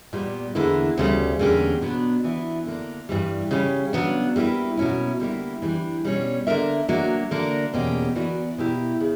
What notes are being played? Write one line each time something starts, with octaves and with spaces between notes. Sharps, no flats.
A#2 G3 B3
E2 D3 A#3 E4 B4
D2 C#3 G3
E2 D3 A#3 C#4 G4
B2 F#3 B3 D4
E3 B3 E4
D3 A#3 D4
G2 E3 G3
C#3 G3 C#4
C#3 F#3 B3 D4
G3 A#3 E4 B4
B2 F#3 A#3 C#4 E4
D3 G3 A#3 E4
E3 G3 B3 D4
B2 G3 C#4 G4 C#5
D3 A#3 D4 A#4 E5
F#3 A#3 D4
D3 A#3 D4 A#4
E2 B2 A#3 C#4 G4
E3 B3 F#4 A#4 D5
B2 A#3 E4 G4
C#3